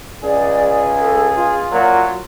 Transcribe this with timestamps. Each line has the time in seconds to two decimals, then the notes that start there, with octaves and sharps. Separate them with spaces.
0.23 C#2 G#4 D5
1.00 A4
1.35 F4
1.72 A#2 F#3